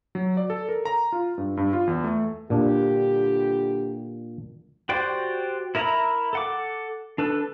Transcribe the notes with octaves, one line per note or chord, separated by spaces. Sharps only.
F#3
D5
A4
A#4
A#5
F4
G2
G2
F4
E2
A3
A#2 D3 G3 D4 G4
F#4 G4 C5 D5 G5
E4 A#4 E5 A#5 B5
A4 F#5 D6
D4 A4 B4